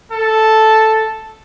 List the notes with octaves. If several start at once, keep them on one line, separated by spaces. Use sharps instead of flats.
A4